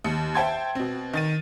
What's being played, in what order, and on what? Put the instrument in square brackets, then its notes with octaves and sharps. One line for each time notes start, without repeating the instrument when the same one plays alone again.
[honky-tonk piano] D#2 C#7
C5 E5 G5 A5 C6 G#6
B2 C4
D#3 A6 D#7